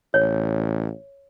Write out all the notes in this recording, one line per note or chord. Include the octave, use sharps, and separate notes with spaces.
A1 C#5